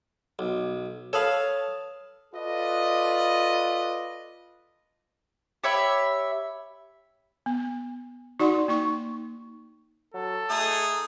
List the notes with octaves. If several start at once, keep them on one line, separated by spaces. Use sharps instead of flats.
B1
A4 B4 C#5 F5 A5 D#6
F4 A4 B4 D5 D#5
G4 C#5 E5 B5
B3
D#4 F#4 D5 F#5 C6
A#3 D#4 C#6
F#3 A4
A3 D#4 G#4